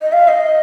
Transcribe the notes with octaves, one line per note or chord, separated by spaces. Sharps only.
D#5
F5
D#5